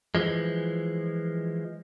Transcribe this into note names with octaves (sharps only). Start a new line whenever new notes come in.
E3 F3 G#3